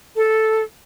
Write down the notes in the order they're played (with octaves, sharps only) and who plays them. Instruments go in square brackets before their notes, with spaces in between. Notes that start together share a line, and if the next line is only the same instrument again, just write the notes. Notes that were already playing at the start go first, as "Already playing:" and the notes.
[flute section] A4